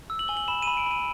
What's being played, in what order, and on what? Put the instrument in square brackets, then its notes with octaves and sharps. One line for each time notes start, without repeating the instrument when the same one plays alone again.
[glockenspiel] E6
F#7
G#5 G7
F#7
B5 E7
B5 D#7
D7
B5 D#7